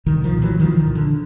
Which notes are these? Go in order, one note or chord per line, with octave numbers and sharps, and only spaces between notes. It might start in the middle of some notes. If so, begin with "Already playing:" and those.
C2 D#3
D#3 F3
A#2
E3 F#3
C2 D#3 F3
D#3
A#2
D3